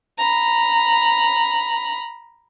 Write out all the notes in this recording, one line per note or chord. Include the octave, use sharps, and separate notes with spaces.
A#5 B5